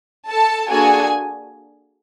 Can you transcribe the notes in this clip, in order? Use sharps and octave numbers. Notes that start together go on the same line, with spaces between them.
A4 A5
A#3 D4 F#4 G#4 A4 G#5